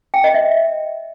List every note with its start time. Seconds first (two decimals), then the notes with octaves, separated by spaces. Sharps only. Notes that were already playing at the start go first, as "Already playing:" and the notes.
0.14 G5
0.24 D#5
0.34 E5